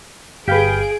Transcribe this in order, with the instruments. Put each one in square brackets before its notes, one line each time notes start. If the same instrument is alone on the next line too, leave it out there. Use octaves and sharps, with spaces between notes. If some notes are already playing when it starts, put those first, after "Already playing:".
[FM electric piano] G1 F5 G6 [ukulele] G4 B4 [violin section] G#4 D7